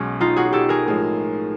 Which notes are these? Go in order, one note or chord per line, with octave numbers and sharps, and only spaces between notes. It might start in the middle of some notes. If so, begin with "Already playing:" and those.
Already playing: B1 B2 G#3 C#4
D#4 F4
F#4 G#4
G4 A4
G#4 A#4
A2 F3 G#3